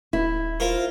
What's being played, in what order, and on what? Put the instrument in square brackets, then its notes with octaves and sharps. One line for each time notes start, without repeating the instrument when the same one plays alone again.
[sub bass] D#1 [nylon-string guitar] E4
[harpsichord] F4 A#4 C5